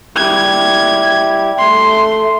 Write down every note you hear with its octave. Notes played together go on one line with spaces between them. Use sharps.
G3 E4 G4 G#6
A3 C6